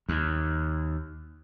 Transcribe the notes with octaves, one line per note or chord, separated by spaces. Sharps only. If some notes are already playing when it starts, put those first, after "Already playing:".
D#2